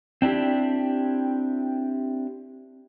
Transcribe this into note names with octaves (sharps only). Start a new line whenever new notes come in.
C4 D4 E4 G4